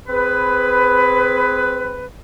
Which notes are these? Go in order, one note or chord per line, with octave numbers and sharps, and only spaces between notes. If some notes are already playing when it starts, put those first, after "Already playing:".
C4 G#4 B4